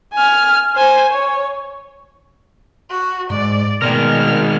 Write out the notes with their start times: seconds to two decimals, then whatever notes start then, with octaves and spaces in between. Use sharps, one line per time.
0.14 G#5 F6
0.76 C5 G#5
1.13 C#5
2.90 F#4
3.30 G#2 D5
3.82 B2 D#3 G#3 A3 A#4 D5 G5 F6